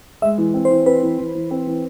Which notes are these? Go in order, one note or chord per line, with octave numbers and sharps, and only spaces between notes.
G#3 E5
E3
C4
C5
E3
C4 B4
E3
E3
E3
C4
E3